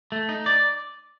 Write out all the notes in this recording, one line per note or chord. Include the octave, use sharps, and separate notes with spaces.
A3
D#4
D5